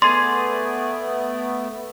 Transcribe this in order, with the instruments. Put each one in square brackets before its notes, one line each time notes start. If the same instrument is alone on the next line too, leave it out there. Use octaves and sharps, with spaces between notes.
[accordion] A3 B3 [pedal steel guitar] G#4 D5 [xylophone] C6